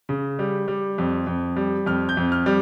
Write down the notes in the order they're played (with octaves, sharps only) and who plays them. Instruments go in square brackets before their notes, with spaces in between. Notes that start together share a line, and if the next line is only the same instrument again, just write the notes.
[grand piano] C#3
G3
G3
F2
F2
G3
F2 F6
G6
F2
F6
G3